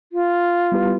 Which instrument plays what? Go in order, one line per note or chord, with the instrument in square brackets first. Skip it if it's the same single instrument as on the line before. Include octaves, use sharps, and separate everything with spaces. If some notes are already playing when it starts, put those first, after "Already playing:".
[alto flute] F4
[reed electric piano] G3 B3 E4 G4 B4